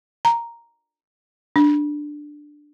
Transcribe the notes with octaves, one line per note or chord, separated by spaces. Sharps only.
A#5
D4